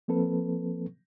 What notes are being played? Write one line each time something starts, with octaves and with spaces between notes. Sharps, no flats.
F3 A#3 C4 A4 B4